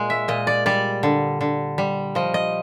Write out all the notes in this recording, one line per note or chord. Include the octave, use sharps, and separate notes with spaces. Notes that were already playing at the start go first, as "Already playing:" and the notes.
Already playing: A#2 G#3
E5
A#2 D#5
D5
G3 D5
D3
D3
G3
F3 D#5
D#5